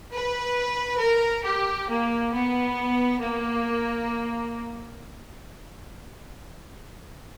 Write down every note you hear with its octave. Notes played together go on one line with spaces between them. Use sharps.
B4
A#4
G4
A#3
B3
A#3